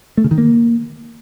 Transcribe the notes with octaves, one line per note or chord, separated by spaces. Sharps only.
A3
C#3
D#3
A#3